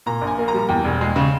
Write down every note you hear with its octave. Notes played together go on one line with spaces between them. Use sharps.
A#2 A#5
A#1
G#5
A#3
A#5
G3
E2 G5
E1
G#3
C#3